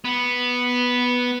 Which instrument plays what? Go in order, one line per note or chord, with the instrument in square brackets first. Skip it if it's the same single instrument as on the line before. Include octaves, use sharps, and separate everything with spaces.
[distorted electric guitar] B3